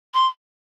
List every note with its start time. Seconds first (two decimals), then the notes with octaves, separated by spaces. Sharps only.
0.14 C6